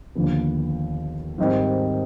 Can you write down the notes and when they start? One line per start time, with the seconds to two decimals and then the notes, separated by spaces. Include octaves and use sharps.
0.15 D#2 D3 F3 B3
1.38 G#2 D#3 G3 C4 D#4